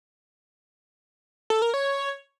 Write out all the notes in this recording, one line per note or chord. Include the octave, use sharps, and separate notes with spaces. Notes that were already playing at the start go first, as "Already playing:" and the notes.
A4
A#4
C#5